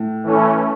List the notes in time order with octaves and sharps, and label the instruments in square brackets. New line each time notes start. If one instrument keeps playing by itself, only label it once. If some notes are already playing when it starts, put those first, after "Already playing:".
Already playing: [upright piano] A2
[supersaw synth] E3 A3 C#4